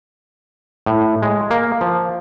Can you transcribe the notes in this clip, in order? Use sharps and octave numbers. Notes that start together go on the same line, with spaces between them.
A2
G#3
A#3
F3